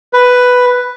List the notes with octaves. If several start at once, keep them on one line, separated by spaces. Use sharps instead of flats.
B4